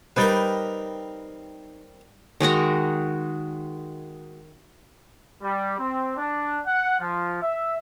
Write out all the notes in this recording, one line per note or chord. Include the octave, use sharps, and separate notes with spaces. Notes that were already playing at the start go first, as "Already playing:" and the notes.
G3 C4 D#4 A#4 B4
D#3 G#3 F#4 A#5
G3
C4
D4
F#5
F3
E5